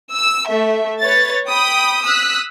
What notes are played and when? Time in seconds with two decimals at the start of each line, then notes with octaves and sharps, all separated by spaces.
0.12 E6
0.48 A3 E5
1.01 B4 C#5 A6
1.49 G5 B5 D#6
2.03 D#6 E6 F#6 B6